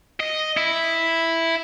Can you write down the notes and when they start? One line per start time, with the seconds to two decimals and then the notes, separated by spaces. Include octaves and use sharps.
0.20 D#5
0.57 E4